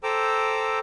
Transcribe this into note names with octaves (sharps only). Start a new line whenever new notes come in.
A4 C5 G5 A#5 D6 E6